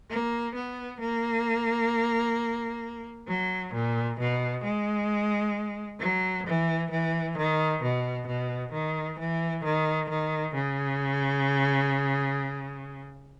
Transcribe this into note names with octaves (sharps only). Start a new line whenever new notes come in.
A#3
B3
A#3
F#3
A#2
B2
G#3
F#3
E3
E3
D#3
B2
B2
D#3
E3
D#3
D#3
C#3